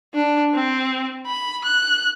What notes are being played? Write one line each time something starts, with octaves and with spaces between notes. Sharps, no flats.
D4
C4
B5
F#6